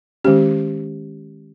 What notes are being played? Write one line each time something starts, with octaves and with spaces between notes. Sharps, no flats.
D#3 G#3 C#4 G4